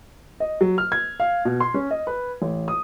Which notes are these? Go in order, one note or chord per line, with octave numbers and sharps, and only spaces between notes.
D#5
F#3
F6
G#6
F5
B2
C6
C#4
D#5
B4
A1
D#6